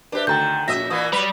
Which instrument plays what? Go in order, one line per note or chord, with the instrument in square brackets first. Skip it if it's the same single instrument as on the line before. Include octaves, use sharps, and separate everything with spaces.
[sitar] D4 G4 [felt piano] B4 C5 E5
[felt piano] D2 A6 [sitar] D#3 [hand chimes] G5 A#5 G6
[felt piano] A#1 F#4 G6 [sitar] F#2 D#5 E5 [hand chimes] A#6
[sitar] A#2 E3 A#3 [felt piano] D#6
[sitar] F#3 B4 [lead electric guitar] G3